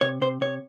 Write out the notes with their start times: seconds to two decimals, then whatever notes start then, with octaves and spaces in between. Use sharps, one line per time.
0.01 C3 C#5
0.21 C3 C5
0.41 C3 C#5